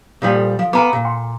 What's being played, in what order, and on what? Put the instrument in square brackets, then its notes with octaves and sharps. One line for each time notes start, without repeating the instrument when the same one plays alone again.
[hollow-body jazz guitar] A#2 F3 G3
[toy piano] A4
[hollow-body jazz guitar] F3
[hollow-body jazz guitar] B3 F5 [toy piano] G#5 A#5 D6
[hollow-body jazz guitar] A#2
[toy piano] G5 C6